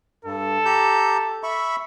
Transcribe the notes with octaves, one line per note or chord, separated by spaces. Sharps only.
G2 A4
G4 A#5 G6
E5 B5 C#6